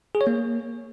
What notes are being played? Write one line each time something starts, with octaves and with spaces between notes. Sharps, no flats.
G#4
C#5
A#3